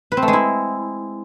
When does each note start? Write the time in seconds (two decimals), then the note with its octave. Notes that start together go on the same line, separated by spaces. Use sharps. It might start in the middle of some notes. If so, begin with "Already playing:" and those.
0.12 B4
0.17 C4
0.22 A3
0.28 G#3
0.33 E4